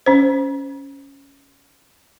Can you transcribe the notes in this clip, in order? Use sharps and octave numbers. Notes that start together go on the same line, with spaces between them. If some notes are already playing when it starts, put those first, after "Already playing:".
C#4 C5